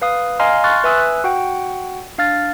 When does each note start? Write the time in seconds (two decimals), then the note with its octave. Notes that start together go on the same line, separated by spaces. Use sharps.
0.02 B4 F5 D#6
0.40 D#5 F5 G#5 A#5 C6 F6
0.64 C6 C#6 F6 F#6 A6
0.84 B4 E5 G#5 D#6 E6 F#6
1.24 F#4 F#5 G5
2.18 D4 F5 F6 A6